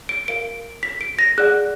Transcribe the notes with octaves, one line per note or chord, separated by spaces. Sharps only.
D7
A#4 F5 D7
B6
D7
A#6
G#4 D5 F#5 F#6